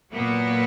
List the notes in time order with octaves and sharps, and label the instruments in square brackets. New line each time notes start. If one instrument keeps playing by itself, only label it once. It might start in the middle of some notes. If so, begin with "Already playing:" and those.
[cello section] A#2 F#3 A#3 B3